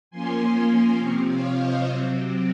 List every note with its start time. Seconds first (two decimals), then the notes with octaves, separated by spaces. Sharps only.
0.10 F3 A#3 C#4 G#5 C6
0.54 G#5 C6
0.97 C3 F3 C4 A#5 C#6
1.27 C#5 F5
1.56 C5 D#5
1.85 C3 F#3 C4